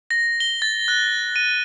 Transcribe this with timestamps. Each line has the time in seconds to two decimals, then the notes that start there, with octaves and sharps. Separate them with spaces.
0.11 A#6
0.40 G7
0.62 A6
0.88 F#6
1.36 D#7